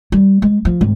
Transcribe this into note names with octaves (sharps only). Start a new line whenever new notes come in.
G3
G#3
F3
G#1